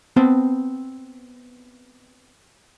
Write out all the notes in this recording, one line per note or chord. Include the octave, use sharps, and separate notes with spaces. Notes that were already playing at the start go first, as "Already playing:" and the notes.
B3 C4 G5 A5